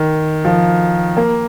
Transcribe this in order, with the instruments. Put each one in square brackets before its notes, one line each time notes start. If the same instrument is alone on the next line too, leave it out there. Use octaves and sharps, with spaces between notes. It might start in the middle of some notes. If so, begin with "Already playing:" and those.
Already playing: [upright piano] D#3
F3
A#3